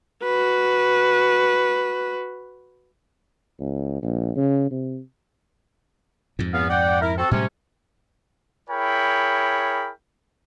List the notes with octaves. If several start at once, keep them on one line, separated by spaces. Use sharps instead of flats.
F#4 B4
C#2
A#1
C#3
C3
F2 G#2
E2 B3 F5
D5 F#5 G5
E4 A#4
C4 F#4 A4
A2 C3 G3 G#3 C#4
E4 G#4 A#4 C#5 G5 B5